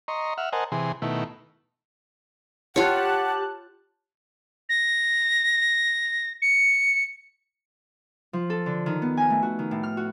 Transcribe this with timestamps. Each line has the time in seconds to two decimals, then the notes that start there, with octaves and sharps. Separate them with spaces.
0.08 D#5 A#5 C6 C#6
0.38 E5 F#5 F6
0.53 A#4 C5 D#5 F#5 G#5 A5
0.72 C3 E3 G#4 C6
1.02 B2 D#3 A3 E4
2.76 F4 G4 C#5 F#5 A5 F#6
4.69 A#6
6.42 C#7
8.33 F3
8.50 A4
8.66 D3
8.86 D#3
9.02 B3
9.17 G#5
9.30 A3
9.43 F#4
9.59 D#3
9.71 A2
9.83 F6
9.97 F#4